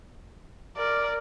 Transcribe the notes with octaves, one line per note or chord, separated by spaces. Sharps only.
A#4 D5